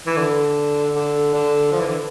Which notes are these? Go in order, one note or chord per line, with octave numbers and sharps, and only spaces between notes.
E3
D3
D3
D3
F3
E3
D3